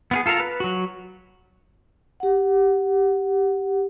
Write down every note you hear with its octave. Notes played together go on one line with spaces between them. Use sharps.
B3 F4 G#4
F4 A4 A#4 F5 A#5
B4
F#3 F#4
G4 F#5